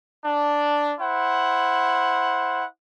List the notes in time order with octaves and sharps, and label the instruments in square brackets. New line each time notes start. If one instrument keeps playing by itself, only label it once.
[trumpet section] D4
E4 C5 F#5